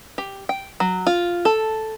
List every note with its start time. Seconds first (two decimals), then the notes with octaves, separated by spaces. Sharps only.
0.18 G4
0.49 G5
0.80 F#3
1.07 F4
1.45 A4